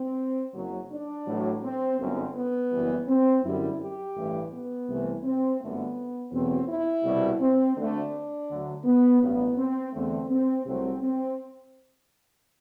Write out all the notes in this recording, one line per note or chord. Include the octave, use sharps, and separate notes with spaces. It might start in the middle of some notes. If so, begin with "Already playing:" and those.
Already playing: C4
F#1 F#2 F#3
D4
A1 A2 F#3
C4
G1 F#2 D3 C4
B3
F#1 F#2 E3 G3
C4
F#2 D3 G3 E4
G4
A1 G2 E3 A3
B3
C2 C3 E3 A3
C4
G1 F#2 D3 A3 B3
E2 B2 F#3 A3 C4
E4
C2 B2 G3
C4
D2 D3 A3 D4
D2 D3 F#3 A3
B3
A1 G2 F#3 B3
C4
E2 D3 A3 C4
C4
C2 C3 F#3 A3 C4
C4